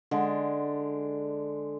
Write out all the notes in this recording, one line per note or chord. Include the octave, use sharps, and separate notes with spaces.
D3 G#3 A5